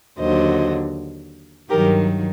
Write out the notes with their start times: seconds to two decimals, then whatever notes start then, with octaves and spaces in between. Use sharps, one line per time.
0.19 D#2 D3 F#3 C5 D#5
1.70 G2 D#3 F#3 G4 A#4